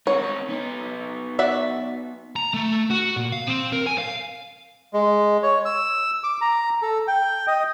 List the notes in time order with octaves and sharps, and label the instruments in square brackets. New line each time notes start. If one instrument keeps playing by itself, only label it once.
[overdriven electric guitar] C4 D#4 [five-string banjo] C#5
[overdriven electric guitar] B3 D#4
[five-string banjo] F#4 D5 E5
[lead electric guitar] A#5
A3
F#4
A#2
F5
C4
A#4
G#5
F5
[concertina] G#3
C#5
E6
D6
A#5
A4
G5
D#5